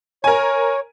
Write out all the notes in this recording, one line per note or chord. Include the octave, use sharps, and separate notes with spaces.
A#4 C#5 G#5